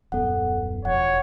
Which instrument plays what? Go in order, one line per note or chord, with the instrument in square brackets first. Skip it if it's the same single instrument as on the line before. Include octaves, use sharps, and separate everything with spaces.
[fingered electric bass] D#1 F#2 B3 [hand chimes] A4 F#5
[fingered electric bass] E1 F3 [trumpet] C#5 [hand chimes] F#5